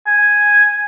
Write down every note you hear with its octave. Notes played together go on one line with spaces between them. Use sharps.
G#5